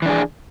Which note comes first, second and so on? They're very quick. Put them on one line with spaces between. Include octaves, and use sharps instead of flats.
E3 D4 G#4